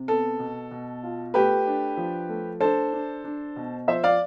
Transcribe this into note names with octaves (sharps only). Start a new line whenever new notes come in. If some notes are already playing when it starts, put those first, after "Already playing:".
Already playing: C3
B3 A4
B2
B2
F4
A3 G4 B4
D4
F3
A3
D4 A4 C5
D4
D4
B2
F3 C5 E5
D5 F5